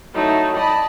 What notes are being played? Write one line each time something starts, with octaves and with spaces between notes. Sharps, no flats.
F#3 A3 D#4 E4
D5 D#5 A5 B5